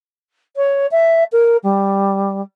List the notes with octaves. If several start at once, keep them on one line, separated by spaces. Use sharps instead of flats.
C#5
E5
A#4
G3